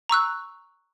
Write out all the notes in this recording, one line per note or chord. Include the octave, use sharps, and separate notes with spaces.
A#5 C#6 E6 F#6